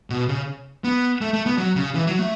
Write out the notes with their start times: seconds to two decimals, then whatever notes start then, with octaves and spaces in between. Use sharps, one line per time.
0.10 B2
0.28 C#3
0.84 B3
1.21 A3
1.33 A3
1.46 B3
1.58 F#3
1.76 C#3
1.95 E3
2.07 F#3
2.19 A3